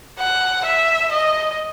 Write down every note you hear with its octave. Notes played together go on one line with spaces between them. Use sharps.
F#5
E5
D#5